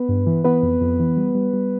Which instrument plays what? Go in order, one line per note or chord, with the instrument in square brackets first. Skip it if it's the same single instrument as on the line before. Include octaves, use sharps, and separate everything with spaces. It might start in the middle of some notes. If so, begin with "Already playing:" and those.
Already playing: [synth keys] B3 B4
G2
E3
E3 B3 B4
F2
F2
E3
G3
G3
G3